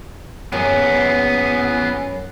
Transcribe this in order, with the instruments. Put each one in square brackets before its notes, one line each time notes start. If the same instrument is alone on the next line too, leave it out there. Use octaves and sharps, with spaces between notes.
[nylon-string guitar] F#2 [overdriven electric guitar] B3 G#4